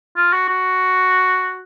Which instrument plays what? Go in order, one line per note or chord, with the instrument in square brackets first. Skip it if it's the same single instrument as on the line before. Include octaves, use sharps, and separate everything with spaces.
[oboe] F4
F#4
F#4